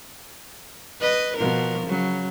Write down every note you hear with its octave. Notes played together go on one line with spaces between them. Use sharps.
B4 D#5
B2 F3 A#4
C#3 F#3